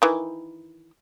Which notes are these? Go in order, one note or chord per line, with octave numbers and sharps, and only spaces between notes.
D#3 E3